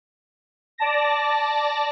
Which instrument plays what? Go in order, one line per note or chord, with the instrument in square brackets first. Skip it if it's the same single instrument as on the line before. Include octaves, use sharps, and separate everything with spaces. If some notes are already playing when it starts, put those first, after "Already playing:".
[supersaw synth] D5 A5 A#6